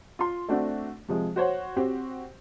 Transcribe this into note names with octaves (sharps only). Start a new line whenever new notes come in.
F4 C6
A3 C4 D4 F#4
C3 F3 G#3
F#4 C5 C#5 F#5
C4 F#4 G4 C5